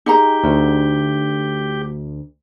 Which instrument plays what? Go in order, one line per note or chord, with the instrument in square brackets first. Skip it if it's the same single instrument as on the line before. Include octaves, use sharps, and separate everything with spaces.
[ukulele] D#4 G#4 A#5 [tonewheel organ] G4
[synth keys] D2